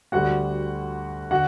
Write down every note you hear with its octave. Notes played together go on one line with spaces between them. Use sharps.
D2 D3 G3 F#4 F#5
D3 F#4 F#5